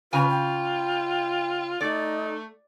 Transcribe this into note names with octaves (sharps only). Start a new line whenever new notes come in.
C#3 F4 B4 G#5
G5
A3 D#4 D5